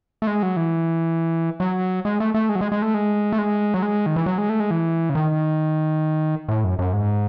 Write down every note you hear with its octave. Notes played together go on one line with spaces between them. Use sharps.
A3
G#3
F#3
E3
F#3
G#3
A3
A3
G#3
F#3
G#3
G#3
A3
G#3
A3
G#3
F#3
G#3
D#3
E3
F#3
G#3
A3
G#3
E3
C#3
D#3
A2
F#2
F#2
G#2